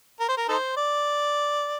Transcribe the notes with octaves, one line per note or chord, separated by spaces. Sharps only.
A#4
C5
A#4
D#4 A4 C5
D5